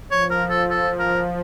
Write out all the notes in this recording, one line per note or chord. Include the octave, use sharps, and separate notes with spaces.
F3 C#5
A#4
A4
A4
A#4